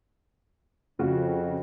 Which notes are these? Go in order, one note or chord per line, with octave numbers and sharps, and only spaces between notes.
F2 C#3 F#4